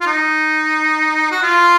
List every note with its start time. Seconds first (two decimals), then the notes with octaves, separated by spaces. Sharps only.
0.01 F4
0.06 D#4
1.31 F#4
1.42 F4